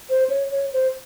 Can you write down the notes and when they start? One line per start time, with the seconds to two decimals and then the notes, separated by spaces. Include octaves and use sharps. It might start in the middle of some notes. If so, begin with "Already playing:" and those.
0.10 C5
0.30 C#5
0.51 C#5
0.73 C5